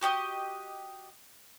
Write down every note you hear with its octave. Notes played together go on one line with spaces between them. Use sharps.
F#4 G4 D5 D#5